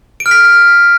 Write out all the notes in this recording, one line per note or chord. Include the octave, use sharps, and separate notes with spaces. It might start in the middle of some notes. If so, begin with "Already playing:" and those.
D7
F6
B6